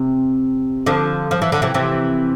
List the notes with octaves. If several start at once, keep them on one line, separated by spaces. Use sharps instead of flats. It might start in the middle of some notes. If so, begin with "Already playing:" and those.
Already playing: C3
D3 F3
F3
E3
D3
C3 E3
C3 E3